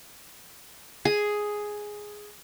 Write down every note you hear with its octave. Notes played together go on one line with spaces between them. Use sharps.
G#4